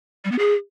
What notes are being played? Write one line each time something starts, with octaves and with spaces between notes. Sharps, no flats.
G3
B3
G#4